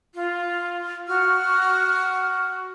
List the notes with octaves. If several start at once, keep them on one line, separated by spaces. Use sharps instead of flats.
F4
F#4 F6